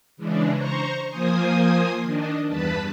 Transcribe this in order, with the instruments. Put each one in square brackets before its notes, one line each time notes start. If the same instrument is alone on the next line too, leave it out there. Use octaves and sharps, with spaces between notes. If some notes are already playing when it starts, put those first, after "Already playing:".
[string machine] C#3 E3 G#3 D4
C5 A#5 C#6
F3 A#3 C5 G#5 D#6
D#3 D4 D#4
E2 G2 B4 A5 B5